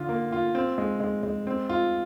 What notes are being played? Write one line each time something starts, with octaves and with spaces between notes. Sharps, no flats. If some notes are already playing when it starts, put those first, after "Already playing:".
Already playing: D3 F4
A#3
F4
C4
G#3
G#3
G#3
C4
F4